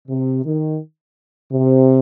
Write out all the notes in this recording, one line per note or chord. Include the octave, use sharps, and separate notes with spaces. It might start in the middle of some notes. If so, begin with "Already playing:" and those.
C3
D#3
C3